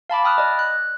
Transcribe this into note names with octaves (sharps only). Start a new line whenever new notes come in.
F5 A5 B5 D6
G5 B5 D#6 F6 F#6
D5 D#5
F#6